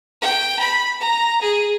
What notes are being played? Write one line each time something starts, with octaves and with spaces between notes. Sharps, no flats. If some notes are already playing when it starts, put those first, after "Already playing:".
G5
B5
A#5
G#4